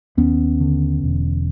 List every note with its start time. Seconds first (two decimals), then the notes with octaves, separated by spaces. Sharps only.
0.17 D#2 B3 C#4
0.60 D3
1.03 E1